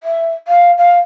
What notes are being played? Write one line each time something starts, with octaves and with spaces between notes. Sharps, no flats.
E5
F5
F5